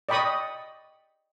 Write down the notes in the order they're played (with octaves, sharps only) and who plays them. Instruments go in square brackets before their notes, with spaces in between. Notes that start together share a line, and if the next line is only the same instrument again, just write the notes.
[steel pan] D5 D#5 G5 B5 C#6 D#6